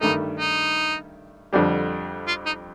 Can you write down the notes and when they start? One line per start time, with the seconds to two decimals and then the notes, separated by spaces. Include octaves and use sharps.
0.01 G2 D#3 A3 D#4
0.39 D#4
1.53 F2 D3 G3 D4 G4
2.27 F4
2.46 D#4